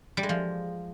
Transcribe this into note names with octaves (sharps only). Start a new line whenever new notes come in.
G3
G#3
F3